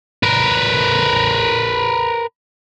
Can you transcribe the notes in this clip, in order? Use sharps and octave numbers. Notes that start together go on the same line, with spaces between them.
A#4 B4